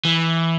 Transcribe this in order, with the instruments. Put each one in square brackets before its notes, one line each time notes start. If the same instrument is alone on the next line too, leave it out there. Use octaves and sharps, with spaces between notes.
[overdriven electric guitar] E3